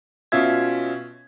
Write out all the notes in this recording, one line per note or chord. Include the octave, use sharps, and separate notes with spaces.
B2 C#4 F4 E5 G#6